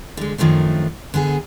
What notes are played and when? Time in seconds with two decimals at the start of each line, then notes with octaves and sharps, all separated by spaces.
0.17 D3 G#3
0.38 F#2 D#3 F3 A3 D4
1.14 D3 B3 G#4